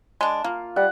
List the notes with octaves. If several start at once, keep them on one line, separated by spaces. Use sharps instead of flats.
G#3 D4
A#3 F4
G3 F#5